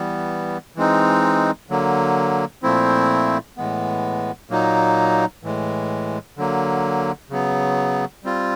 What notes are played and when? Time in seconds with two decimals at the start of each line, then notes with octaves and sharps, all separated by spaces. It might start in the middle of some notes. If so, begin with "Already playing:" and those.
Already playing: E3 G3 B3
0.76 E3 G#3 C4 D#4
1.70 D3 F#3 A#3
2.63 A#2 F3 A3 C4 E4
3.57 A2 E3 G#3 B3
4.49 A#2 F#3 A#3 D#4
5.43 A2 E3 G#3
6.37 D3 F#3 A#3
7.30 C#3 F#3 B3
8.24 G3 C4 F4